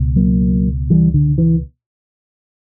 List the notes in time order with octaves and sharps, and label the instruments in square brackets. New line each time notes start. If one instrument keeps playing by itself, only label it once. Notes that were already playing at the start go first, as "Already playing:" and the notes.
Already playing: [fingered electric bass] C#2 B2
F#3 A#3
E3 G3
D3
E3